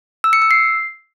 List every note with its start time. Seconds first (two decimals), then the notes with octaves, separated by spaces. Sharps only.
0.24 E6
0.33 C#7
0.42 E6
0.51 C7